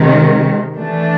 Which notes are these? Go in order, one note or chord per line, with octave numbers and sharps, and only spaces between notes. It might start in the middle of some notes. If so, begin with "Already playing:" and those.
Already playing: C3 D#3 G#3
E3 A3 D4